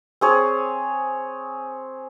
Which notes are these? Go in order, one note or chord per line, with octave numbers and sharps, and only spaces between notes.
C4 G#4 C#5